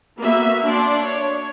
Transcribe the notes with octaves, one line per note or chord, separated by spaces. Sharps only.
A#3 B3 F#4 E5
D4 D5 C6
C#5